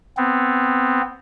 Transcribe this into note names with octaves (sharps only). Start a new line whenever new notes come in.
B3 C4